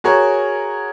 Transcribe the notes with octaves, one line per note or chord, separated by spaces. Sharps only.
F#4 G#4 A#4 C#5